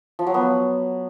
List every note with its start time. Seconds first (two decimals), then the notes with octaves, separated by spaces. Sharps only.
0.19 F3
0.27 F#3
0.34 B3